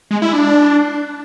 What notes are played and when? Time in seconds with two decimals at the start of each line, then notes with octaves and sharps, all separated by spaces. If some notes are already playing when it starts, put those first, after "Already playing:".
0.11 G#3
0.22 E4
0.33 D4